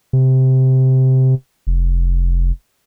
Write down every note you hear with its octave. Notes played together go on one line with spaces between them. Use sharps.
C3
F1